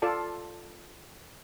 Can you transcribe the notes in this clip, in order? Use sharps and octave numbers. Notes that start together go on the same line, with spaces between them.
F4 A4 D5 A5